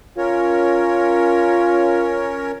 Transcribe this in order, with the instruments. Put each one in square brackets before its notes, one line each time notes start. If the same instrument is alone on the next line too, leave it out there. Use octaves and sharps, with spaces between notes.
[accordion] C#4 A#4 C#5 [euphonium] F4